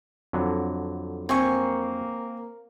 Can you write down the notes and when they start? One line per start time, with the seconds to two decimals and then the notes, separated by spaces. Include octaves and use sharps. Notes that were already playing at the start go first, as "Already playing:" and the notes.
0.33 F2 D3 F#3
1.29 A#3 C4 G#5 C#6